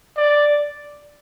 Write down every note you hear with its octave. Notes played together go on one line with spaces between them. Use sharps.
D5